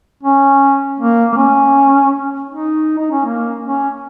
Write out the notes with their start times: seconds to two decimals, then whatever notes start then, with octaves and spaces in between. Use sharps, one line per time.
0.23 C#4
1.00 A#3
1.33 A#3
1.37 C#4
2.50 D#4
2.98 D#4
3.11 C#4
3.25 A#3
3.63 C#4